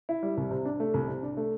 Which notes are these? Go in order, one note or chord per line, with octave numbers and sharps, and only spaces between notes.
E4
G3
C2
C3
D4
A3
C2
C3
D4
A3